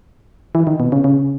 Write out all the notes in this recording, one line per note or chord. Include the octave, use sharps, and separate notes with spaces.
E3
D#3
B2
C#3
C#3